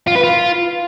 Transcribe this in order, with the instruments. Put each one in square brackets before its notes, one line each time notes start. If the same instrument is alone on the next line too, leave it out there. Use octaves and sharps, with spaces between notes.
[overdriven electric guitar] F4
B4
F4